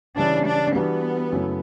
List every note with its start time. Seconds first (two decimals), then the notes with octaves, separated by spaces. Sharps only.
0.17 C#3 E3 G3 C#4 D4 E4
0.46 D4
0.75 E3 G3 B3 D4 F#4
1.32 F#2 C#3 F#3 A3 E4